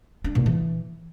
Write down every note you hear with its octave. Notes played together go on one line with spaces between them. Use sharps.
D4
A#2
E3